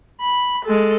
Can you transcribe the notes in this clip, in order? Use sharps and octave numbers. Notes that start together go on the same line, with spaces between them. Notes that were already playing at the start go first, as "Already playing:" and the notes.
B5
G#3 A4